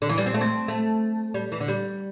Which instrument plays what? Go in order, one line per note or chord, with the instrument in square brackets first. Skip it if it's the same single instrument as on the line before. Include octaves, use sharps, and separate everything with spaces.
[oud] D3
E3
G3
C4
A3
C4
A3
G3
E3
D3
G3